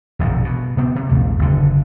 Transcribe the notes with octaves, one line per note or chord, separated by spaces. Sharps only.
E1 A#1 F#2 C3
B2
C3 B3 C4
C3
A#1 D#2 A3
F#1 D3